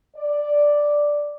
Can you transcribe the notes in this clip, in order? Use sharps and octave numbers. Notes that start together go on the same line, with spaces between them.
D5